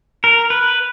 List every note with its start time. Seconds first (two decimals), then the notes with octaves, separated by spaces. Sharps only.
0.24 A#4
0.50 B4